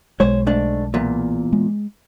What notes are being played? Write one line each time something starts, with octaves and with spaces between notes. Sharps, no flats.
B1 G#3 C5 C#5
G#2 A3 D4
E2 A#2
G#3